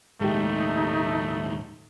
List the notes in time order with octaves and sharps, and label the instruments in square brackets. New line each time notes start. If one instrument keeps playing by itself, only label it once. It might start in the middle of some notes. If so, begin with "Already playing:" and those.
[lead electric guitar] D#2 A2 [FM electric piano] G#3 G4 [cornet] A3 [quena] D#4